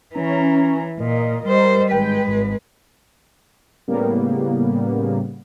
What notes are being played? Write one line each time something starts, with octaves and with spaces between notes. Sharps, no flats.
E3 C#4 A#5
A#2 A#4 D#5
G3 C5
G#1 G#3 B4 G5
G#1
A2 C#3 G3 A#3 B3